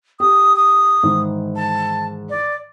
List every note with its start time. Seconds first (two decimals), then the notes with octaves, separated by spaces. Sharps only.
0.20 G4 D#6
0.56 D#6
1.03 G#2 D#3 E3
1.56 A5
2.30 D5